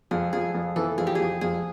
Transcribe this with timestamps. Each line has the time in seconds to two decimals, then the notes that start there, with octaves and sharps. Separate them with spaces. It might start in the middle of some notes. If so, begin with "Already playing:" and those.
0.11 F2 G#4
0.33 F2 G#4
0.55 F2
0.76 E3 A4
0.98 F2 G#4
1.07 G4
1.15 F2 G#4
1.41 F2 G#4